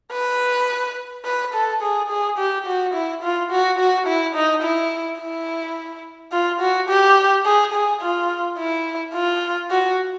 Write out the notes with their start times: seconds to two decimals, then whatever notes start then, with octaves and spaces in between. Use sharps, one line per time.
0.12 B4
1.25 B4
1.54 A4
1.82 G#4
2.10 G#4
2.38 G4
2.66 F#4
2.94 E4
3.23 F4
3.51 F#4
3.79 F#4
4.07 E4
4.35 D#4
4.63 E4
5.20 E4
6.32 F4
6.60 F#4
6.88 G4
7.45 G#4
7.73 G#4
8.01 F4
8.58 E4
9.14 F4
9.70 F#4